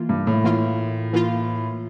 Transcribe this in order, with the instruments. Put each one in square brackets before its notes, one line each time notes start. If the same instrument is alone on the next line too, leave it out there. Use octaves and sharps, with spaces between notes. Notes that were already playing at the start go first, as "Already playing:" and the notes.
Already playing: [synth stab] E3 A#3 F4
[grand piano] G2
A2
[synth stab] E3 A#3 F4
E3 A#3 F4